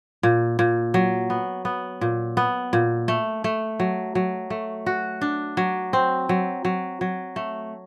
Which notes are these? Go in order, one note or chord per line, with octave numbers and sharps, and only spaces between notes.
A#2
A#2
F#3
B3
B3
A#2
B3
A#2
A3
A3
F#3
F#3
A3
F#4
D4
F#3
C4
F#3
F#3
F#3
A3